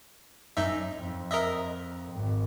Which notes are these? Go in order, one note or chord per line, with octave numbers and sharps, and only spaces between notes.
F#2 D#4 E5
F2
A#4 D#5 E5
G#1